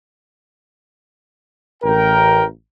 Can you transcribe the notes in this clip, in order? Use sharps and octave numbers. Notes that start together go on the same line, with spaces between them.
A1 A#4 G5